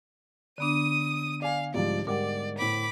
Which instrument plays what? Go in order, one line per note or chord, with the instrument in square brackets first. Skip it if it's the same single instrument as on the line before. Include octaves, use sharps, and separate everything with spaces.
[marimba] D3 B3 D4 [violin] D#6 D#7
[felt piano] D5 G#5 [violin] F5
[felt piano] C2 G#2 F3 [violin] D5
[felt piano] G#2 G3 D6 [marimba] A#4 F#5 [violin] D5
[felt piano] A2 C5 [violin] B5 D6